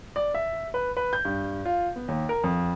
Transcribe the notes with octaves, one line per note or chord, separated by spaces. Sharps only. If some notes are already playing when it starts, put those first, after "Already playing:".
D5
E5
B4
B4
G6
G2
F4
B3
D#2
A#4
F2